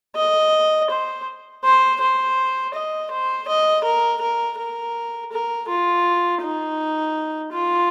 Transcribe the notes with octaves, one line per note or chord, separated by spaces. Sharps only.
D#5
C5
C5
C5
D#5
C5
D#5
A#4
A#4
A#4
A#4
F4
D#4
F4